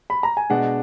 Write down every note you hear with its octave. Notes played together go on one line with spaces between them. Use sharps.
B5
A#5
G#5
B2 G#3 D4 F#5